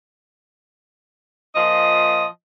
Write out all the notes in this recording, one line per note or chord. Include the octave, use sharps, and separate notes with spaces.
A#2 F3 D#5